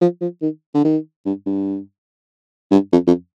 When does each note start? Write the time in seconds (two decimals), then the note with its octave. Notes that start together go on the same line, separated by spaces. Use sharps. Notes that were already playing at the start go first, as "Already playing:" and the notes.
0.01 F3
0.21 F3
0.42 D#3
0.75 D3
0.85 D#3
1.26 G2
1.46 G2
2.72 G2
2.92 F2
3.07 F2